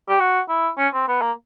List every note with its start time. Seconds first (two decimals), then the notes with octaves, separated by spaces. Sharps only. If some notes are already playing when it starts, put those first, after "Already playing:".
0.09 G4
0.20 F#4
0.49 E4
0.78 C#4
0.93 C4
1.08 B3
1.21 A#3